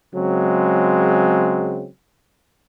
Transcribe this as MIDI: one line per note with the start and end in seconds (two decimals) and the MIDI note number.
0.14 1.87 49
0.14 1.87 54
0.14 1.87 56
0.14 1.87 60